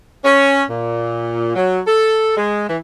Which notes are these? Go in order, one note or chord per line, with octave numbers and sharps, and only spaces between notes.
C#4
A#2
F#3
A4
G#3
E3